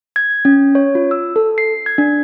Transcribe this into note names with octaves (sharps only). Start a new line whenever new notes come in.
G#6
C#4
C#5
F4
E6
A4
C7
G#6
D4